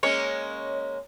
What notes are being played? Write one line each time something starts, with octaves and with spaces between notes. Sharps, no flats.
G#3 A#3 C#4 C#5